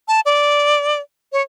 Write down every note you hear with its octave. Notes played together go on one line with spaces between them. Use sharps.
A5
D5
C#5